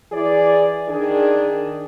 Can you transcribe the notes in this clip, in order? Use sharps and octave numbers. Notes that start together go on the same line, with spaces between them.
E3 E4 G#4 D5
D#3 D4 G#4